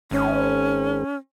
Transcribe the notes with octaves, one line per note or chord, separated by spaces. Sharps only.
G#1 C#4